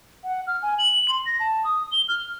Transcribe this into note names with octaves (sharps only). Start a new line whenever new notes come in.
F#5
F6
G#5
F#7
C6
A#6
A5
D#6
G7
F6